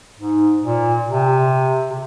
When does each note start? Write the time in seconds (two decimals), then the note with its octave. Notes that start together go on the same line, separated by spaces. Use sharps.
0.18 G#2
0.63 A#2
1.08 C3
1.90 C3